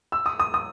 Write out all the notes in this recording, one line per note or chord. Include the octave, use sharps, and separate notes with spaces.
E6
D#6
D#6
D#6